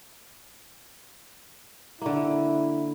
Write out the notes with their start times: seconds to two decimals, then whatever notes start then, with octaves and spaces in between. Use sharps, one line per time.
2.02 D3 A#3 E4